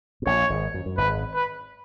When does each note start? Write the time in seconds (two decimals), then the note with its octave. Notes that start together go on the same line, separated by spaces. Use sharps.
0.22 B2
0.26 A#1 A#2 C#5
0.50 G#1 G#2
0.74 F#2
0.86 F#2
0.97 G#1 G#2 B4
1.34 B4